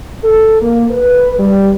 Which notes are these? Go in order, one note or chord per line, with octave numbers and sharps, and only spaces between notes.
A4
A#3
B4
G3